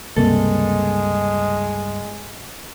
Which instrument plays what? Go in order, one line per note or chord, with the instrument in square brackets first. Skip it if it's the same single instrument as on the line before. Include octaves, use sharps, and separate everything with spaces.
[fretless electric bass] C#2 C3 A#3 [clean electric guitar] G2 A4 [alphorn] G#3